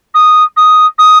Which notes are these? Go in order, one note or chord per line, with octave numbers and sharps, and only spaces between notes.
D#6
D#6
D#6